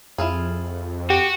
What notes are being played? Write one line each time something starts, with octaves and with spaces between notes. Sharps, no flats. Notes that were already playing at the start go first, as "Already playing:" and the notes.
F2 E4 F4 G#4
F#4 G4